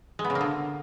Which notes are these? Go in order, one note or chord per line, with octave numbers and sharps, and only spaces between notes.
G#3
B3
C#3
A#3
D3